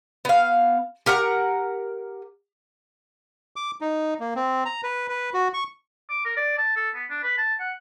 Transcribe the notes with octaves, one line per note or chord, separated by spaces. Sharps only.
B3 F5
G4 A#4 F#5 A#5
D6
D#4
A#3
C4
A#5
B4
B4
F#4
C#6
D6
A#4
D5
A5
A4
B3
D4
B4
A5
F#5